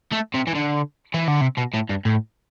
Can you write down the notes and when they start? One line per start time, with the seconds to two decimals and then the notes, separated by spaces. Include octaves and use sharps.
0.12 A3
0.34 C3
0.47 E3
0.55 D3
1.14 E3
1.28 D3
1.41 C3
1.57 B2
1.74 A2
1.89 G2
2.05 A2